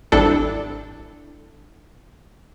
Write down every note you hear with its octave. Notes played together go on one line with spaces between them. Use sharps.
G#1 G3 D4 E4 A4